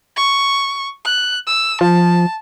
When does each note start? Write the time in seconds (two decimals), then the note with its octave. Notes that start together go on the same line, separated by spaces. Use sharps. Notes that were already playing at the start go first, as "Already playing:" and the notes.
0.16 C#6
1.05 F#6
1.47 E6
1.81 F3 A5